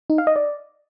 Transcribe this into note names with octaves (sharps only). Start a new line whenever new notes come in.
D#4
F5
D#5
D5